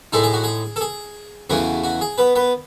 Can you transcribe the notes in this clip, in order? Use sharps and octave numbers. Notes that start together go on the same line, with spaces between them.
A2 G#3 D#4 A4
G#4
F#4
G#4
A4
G#4
E2 C#3 E3 A3 F#4
F#4
G#4
B3 B4
B3 B4